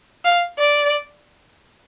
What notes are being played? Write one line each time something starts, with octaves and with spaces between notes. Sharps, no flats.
F5
D5